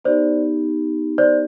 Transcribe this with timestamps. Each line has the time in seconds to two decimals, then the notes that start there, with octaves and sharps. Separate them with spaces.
0.04 B3 D#4 G4 C5 D5
1.18 C5 D5